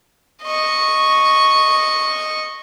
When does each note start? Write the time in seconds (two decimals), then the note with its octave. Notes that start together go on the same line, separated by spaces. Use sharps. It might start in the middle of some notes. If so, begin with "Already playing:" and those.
0.44 D#5 C#6